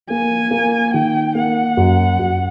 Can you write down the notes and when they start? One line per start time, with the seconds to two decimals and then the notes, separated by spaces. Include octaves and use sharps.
0.10 A#3 G#5
0.51 A#3
0.94 D#3 G5
1.35 A#3 F#5
1.77 F#2
2.19 F#2